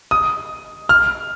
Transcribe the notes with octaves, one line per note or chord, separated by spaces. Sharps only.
D#6
F6